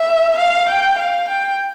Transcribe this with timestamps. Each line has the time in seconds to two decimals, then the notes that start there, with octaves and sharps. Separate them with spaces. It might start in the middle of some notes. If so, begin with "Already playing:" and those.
Already playing: E5
0.38 F5
0.69 G5
0.98 F5
1.28 G5